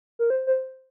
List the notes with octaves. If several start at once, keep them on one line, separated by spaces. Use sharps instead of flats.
A#4
C5
C5